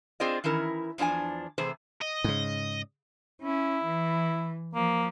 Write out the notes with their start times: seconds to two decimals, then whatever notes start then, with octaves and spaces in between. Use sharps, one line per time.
0.20 C4 F4 G#4 C5 D5 D#5
0.44 D#3 E3 C#4 E4 A#4
0.98 E2 F3 D4 E4 G#5
1.58 C3 E3 A3 G#4 C5
2.01 D#5
2.24 G#2 C#3
3.42 C#4 E4
3.85 E3
4.75 F3 A#3